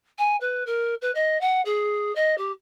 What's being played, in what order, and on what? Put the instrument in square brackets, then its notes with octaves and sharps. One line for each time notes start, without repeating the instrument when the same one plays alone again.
[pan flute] G#5
B4
A#4
B4
D#5
F#5
G#4
D#5
G4